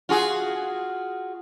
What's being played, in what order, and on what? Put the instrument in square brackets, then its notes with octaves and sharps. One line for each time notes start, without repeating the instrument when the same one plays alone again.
[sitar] F4 F#4 G#4